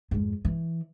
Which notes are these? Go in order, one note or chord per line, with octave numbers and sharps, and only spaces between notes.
F2 G#2
E3